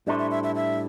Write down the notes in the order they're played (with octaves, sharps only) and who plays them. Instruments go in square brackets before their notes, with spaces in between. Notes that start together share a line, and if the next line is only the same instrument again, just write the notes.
[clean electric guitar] A2 G3 D4 A4 C5 [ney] E5
[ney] E5
E5
E5
E5